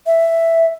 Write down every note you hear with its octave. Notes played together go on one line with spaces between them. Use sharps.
E5